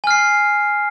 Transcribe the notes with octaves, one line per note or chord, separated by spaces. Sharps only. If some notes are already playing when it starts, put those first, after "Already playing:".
G#5 F6 C7